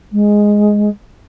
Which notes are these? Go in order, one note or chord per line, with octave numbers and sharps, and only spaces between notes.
G#3